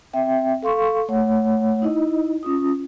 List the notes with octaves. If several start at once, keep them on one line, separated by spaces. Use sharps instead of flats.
C4 E5 G5
A4 F5 C6 C#6
A3 C#5 F#5
D#4 E4 D#5
C#4 F4 D#6